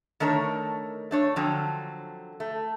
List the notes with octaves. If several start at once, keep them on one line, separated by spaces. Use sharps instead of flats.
D#3 A3 D4 A#4 C#5
A3 D4 C#5
D3 F3 F#3 C4
A3